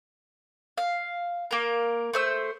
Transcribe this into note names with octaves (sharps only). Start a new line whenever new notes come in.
F5
A#3 A#4
A3 C5 E6